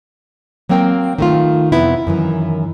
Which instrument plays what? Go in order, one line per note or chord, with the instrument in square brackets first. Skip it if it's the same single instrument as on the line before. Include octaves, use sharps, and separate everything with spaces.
[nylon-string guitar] F#3 A#3 C4 A#4 G5
D#3 A3 F4
F2 C3 B3 E4
F#2 D#3 E3